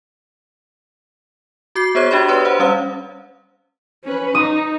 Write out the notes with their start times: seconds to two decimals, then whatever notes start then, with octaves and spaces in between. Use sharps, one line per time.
1.75 F#4 D6 G6 C7
1.95 B3 G#4 C5 C#5 G#6 G7
2.11 D4 F#4 G4 D5 B5
2.28 B4 C#5 C6
2.45 C5 F#5
2.59 G3 C#4 C#5 F5 E6
4.04 C#4 B4
4.35 D#4 D#6